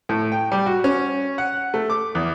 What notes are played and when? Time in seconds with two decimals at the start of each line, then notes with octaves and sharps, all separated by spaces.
0.09 A2
0.32 G5
0.52 G3
0.66 F#4
0.84 C#4
1.38 F#5
1.74 A3
1.90 D6
2.15 E2